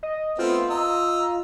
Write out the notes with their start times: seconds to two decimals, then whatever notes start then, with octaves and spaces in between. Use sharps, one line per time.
0.03 D#5
0.39 A3 B3 C4 F4
0.70 D#5 A#5 E6